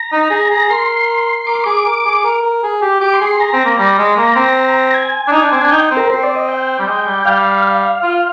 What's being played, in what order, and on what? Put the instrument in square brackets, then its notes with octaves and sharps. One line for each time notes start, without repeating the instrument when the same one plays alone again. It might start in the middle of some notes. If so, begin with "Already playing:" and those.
Already playing: [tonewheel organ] A#5
[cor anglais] D#4
G#4
G#4
[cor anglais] A#4 [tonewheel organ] C6
[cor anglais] A#4 [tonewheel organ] D6
[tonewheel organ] C6
[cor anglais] G#4 [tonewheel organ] D6
[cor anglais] A#4
G#4
A#4
A#4
G#4
G4
[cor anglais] G4 [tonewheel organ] D6
[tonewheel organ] C6
[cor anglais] G#4
[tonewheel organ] C6
[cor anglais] G#4 [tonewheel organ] A#5
[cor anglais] C4
A#3
G3
G#3
A#3
C4
[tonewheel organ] A#5
G#5
[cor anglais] D4
D#4
D4
C4
D4
[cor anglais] D#4 [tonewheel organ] G5
[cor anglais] C4
[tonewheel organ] A#4
[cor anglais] C4 [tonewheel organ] C5
[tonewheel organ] D5
D#5
G5
[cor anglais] G3
G#3
G3
[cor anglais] G3 [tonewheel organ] F5
[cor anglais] F4